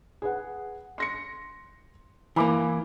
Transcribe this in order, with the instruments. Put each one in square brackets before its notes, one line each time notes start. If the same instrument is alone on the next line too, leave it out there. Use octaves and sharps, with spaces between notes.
[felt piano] G#4 B4 F#5
C6 A#6 C#7
[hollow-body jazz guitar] E3 A#3 [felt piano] G#5 B5 D6